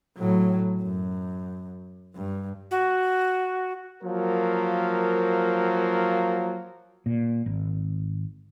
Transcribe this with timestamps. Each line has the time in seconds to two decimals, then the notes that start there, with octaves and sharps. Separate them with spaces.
0.18 A2 F#3
0.83 F#2
2.15 G2
2.71 F#4
4.03 F3 F#3 A#3 A#4
7.06 A#2
7.46 G#1